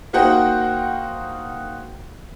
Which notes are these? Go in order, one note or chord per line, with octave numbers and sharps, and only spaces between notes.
A#3 D#4 F#4 C5 F#5 G5